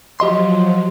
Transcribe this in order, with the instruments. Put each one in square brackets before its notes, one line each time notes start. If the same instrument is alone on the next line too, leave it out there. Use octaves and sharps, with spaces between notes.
[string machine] F3 F#3 [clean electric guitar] G4 D#5 C6